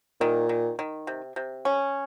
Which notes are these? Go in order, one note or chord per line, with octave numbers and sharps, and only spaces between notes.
A#2 D#3
D#3
D#3
C3
C3
C#4